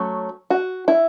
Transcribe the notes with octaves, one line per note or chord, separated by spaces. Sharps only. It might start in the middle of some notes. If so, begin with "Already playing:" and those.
Already playing: F#3 A3 C#4
F#4
E4